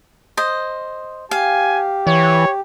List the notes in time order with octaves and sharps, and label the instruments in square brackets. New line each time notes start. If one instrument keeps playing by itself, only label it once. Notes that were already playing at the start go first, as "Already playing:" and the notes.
[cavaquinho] C5 D#5
[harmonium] G4 [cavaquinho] F5 [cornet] G#5
[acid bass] E3 [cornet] C#5